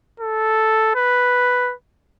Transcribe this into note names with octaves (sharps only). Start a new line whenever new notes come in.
A4
B4